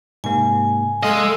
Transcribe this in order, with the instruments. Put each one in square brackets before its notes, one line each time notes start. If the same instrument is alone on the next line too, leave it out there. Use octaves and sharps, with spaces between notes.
[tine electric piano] G#2 C3 A#3 [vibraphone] G#5
[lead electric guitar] G#3 D#5 [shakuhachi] A4 [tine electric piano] F5